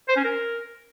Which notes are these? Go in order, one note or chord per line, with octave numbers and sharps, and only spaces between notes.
C5
C#4
A#4